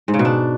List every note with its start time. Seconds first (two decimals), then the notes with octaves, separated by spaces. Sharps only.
0.08 G#2
0.14 C#3
0.19 B2
0.25 D4